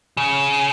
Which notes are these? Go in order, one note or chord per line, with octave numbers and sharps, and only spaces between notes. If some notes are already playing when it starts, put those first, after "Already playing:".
C#3